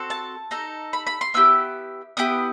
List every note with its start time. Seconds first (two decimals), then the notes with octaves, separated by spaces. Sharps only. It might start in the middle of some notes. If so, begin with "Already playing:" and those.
Already playing: C4 F#4 A4
0.10 A5
0.51 D#4 A4
0.93 B5
1.07 B5
1.21 C6
1.34 B3 E4 G4 E6
2.17 B3 E4 G4 D#6